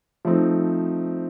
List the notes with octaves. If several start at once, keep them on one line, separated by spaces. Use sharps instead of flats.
F3 A3 C4 D#4